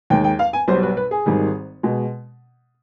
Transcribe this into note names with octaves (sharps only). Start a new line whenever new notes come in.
D#2 D#3 G#3 G5
G5
F5
G#5
B1 B2 G3 C5
B4
B4
G#4
G#1 G#2 D#3 G3
B2 G#3